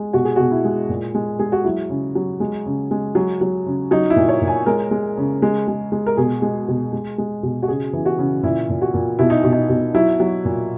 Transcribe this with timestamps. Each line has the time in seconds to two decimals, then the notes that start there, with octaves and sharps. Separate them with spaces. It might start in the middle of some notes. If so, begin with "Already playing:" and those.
Already playing: G#3
0.13 B2 F#4
0.25 G#4
0.36 B2 F#4
0.51 E4
0.65 G#3
0.89 A#2
1.15 G#3
1.39 G#3 G#4
1.52 F#4
1.64 F#3 E4
1.90 C#3
2.15 F#3
2.40 G#3
2.66 C#3
2.91 G#3
3.15 F#3
3.41 F#3
3.66 C#3
3.91 F#3 D#4
4.10 E4
4.16 A#2
4.29 C#5
4.42 A#2
4.47 G#5
4.66 G#3 A#4
4.91 G#3
5.17 C#3
5.42 G#3
5.68 G#3
5.92 G#3
6.06 A#4
6.17 B2 G#4
6.42 G#3
6.68 B2
6.93 G#3
7.18 G#3
7.43 B2
7.62 F#4
7.68 C#3 G#4
7.93 E3
8.05 F#4
8.19 C#3
8.43 A#2 E4
8.69 A#2
8.81 F#4
8.94 A#2
9.19 B2 E4
9.30 D#4
9.44 B2
9.52 D#4
9.69 B2
9.94 F#3 E4
10.20 F#3
10.45 A#2